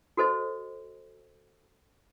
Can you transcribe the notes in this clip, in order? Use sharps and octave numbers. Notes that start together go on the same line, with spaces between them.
F#4 A4 C5 D#5